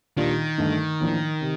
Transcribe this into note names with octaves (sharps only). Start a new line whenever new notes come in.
A#2 D#3 G3 D4 F4
G2 D3 A3 D#4
A2 F3 A#3 D4
C3